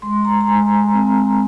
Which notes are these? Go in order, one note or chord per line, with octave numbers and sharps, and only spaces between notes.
G#3 C6
A#5
A#5
G#3 G#5
C4